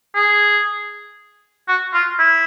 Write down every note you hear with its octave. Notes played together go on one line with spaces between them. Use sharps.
G#4
F#4
F4
E4